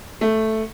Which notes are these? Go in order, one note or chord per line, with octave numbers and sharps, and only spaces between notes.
A3